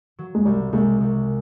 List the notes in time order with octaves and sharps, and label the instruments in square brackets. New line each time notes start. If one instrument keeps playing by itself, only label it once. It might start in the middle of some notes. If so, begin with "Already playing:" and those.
[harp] F#3
[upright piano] G#3
[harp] C2 [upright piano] G3
[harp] C2 [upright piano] G#3
[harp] C2